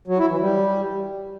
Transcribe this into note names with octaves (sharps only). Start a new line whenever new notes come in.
F#3
E4
E3
G3